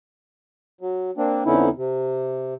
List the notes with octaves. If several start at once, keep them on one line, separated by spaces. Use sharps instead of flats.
F#3
A#3 C4 D4
F2 D3 B3 C#4 D#4 E4
C3